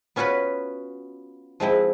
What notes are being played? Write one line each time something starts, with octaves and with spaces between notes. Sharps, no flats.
B3 C#4 F4 F#4 B4 B5
F3 G#3 C4 E4